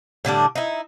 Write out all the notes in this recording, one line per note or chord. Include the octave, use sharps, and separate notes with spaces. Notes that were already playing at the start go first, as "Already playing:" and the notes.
A2 D3 G3 D4
D#4 E4